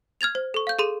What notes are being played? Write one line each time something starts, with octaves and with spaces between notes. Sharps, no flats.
F6 G#6 A6 F7
C5
A4 C#6
F5 G6
G#4 A4 C6 D#7